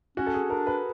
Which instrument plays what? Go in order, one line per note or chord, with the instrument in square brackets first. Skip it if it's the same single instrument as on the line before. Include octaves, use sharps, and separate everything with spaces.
[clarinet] C#4 [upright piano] F#4
[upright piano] A4
G#4
[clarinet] C#4
[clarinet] D4 [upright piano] A#4
[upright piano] B4